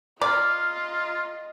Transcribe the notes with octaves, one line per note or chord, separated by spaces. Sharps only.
F4 D5 D#5 A#5 F6